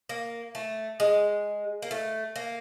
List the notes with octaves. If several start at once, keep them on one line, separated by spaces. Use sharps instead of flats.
A#3
A3
G#3
A#3
A3
A#3